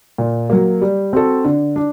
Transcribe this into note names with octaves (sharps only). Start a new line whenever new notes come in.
A#2
F#3 A#3
G3
C4 F#4 A4
D3
D4